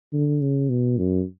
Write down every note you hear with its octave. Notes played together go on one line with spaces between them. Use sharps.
D3
C#3
B2
F#2